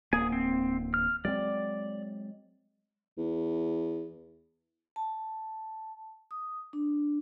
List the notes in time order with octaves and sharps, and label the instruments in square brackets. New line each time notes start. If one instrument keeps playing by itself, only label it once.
[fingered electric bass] D1 A#3 [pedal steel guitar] G#4 G#5
[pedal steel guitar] C4
F6
[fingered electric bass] F#3 G#3 C4 [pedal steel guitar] D5
[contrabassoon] E2
[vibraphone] A5
D#6
D4